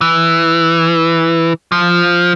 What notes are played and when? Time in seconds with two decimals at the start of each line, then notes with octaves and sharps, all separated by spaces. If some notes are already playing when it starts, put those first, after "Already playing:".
0.01 E3
1.72 F3